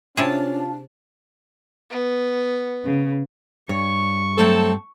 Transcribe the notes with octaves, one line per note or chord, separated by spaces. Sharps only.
C3 C#4 D4 E4 F4 G#4 A5
B3
C#3
G2 C#5 C#6
F#3 A3 C4 A4 A5